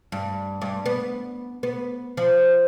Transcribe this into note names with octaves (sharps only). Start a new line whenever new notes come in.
G2
G2
B3
B3
F3